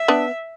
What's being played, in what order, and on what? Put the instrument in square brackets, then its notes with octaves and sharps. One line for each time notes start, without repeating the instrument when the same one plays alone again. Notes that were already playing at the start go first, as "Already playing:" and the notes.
Already playing: [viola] E5
[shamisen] B3 D4